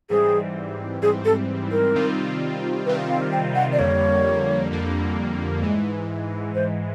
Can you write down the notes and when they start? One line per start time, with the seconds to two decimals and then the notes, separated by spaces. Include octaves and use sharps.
0.10 G#2 E3 G3 C4 G#4
1.02 G#2 E3 G3 C4 G#4
1.25 A4
1.72 A#4
1.94 C3 D#3 G3 C4 F4
2.86 C3 D#3 G3 C4 F4 B4
3.09 F5
3.32 G5
3.55 F#5
3.73 D5
3.78 F2 D3 G3 A#3 C#5
4.71 F2 D3 G3 A#3
5.62 G#2 E3 G#3
6.55 G#2 E3 G#3 C5